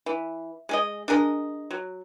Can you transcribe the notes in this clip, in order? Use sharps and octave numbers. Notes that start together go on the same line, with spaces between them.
E3
G#3 G#4 D#5
D4 G#4 A#4 D#5
F#3